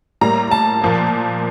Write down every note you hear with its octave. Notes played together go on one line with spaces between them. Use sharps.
A2 G3 A#3 A#5
A5
A#2 F3 A#3